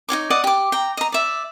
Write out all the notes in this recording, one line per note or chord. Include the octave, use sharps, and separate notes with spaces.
D#4 F4 C#5 D6
D5 D#5 F#5 D6
G4 D6
G5 A#5
D#5 A#5
D5 E5